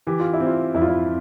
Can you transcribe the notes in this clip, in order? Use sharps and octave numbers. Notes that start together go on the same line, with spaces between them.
E3 G4
F4
E4
C4
F4
F2 E4
F4
E4